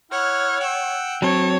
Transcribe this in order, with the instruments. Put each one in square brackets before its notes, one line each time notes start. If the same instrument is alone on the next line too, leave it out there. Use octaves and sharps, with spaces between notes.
[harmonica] E4 F#5 F6 [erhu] C#5
[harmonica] F#5 G5 E6
[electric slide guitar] F#3 C4 [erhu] C#5 [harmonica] A5